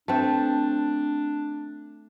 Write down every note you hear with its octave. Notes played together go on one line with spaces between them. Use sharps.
A3 C4 D4